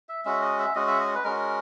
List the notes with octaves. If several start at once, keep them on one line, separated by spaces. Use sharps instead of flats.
E5
G#3 C#4 F#4 E5
D#5
E5
G#3 C#4 F#4 D#5
E5
D#5
B4
G#3 C#4 F#4 A#4